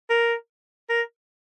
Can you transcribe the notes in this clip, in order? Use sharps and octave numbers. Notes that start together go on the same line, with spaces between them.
A#4
A#4